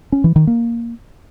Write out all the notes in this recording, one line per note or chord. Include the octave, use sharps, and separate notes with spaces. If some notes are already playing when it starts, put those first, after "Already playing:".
C#4
E3
D#3
A#3